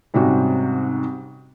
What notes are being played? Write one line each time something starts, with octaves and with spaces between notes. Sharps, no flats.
G#2 C3 G3 C#4 F#4